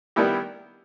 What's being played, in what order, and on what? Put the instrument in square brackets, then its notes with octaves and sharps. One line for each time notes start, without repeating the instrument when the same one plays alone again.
[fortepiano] D#3 G3 B3 E4 G4